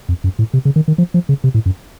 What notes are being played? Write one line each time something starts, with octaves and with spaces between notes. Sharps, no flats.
F2
F#2
A2
C3
C#3
D#3
D#3
F3
F3
C#3
C3
A2
F#2